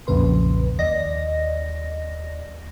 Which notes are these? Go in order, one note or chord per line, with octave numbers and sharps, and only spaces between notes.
B1 F2 A#2 C#3 B4 C6
D#2 D5 D#5 A#6